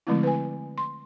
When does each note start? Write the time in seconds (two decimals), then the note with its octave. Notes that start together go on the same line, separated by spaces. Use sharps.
0.07 D3 F3 G#3 A3 C4 E4
0.23 B4 G#5
0.78 C6